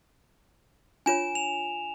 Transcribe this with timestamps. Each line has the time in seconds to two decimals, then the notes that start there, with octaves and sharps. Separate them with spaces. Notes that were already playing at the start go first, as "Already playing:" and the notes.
1.06 D4 F4 C#5 G#5 E7
1.35 F7